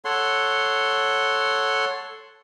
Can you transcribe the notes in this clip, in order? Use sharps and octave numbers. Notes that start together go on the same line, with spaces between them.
A4 C#5 F#5 C6